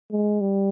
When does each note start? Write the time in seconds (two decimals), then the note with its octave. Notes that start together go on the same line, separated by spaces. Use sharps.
0.11 G#3
0.41 G3